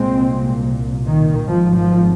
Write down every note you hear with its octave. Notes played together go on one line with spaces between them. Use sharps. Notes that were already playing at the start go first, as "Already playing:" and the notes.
Already playing: C2 A#2 G#3 C4
D#3
G#1 G#2 F3
F3